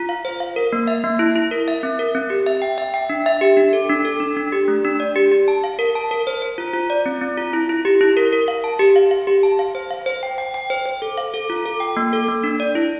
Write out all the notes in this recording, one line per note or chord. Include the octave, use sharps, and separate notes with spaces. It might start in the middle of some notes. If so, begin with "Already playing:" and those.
Already playing: F4
F5
C5
F5
A#4
A#3
E5
A#3
E4
E4
A#4
E5
C4
A#4
C4
G4
E5
G5
E5
G5
D4
E5
G4
D4
A4
D4
A4
D4
D4
G4
A3
D4
D5
G4
G4
A5
F5
A#4
A5
A#4
C5
C5
F4
F4
D5
C4
C4
F4
E4
E4
G4
E4
A#4
A#4
F5
A5
G4
F5
F5
G4
A5
F5
C5
F5
C5
G5
G5
G5
C5
C5
A4
F5
A4
F4
A4
G5
A#3
A4
A#3
D4
D5
E4